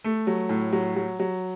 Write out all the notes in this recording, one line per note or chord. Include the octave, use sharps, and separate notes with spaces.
A3
F#3
A2
F#3
F#3
F#3